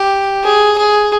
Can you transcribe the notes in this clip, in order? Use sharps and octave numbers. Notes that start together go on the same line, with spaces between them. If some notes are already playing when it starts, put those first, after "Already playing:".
Already playing: G4
G#4
G#4